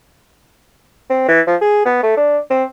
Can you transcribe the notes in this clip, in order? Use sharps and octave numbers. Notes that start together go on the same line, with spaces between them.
C4
E3
F3
G#4
B3
A3
D4
C4